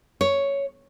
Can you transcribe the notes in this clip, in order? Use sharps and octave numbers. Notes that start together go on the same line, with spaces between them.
C#5